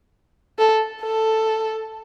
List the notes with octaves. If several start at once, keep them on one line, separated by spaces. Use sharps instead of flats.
A4
A4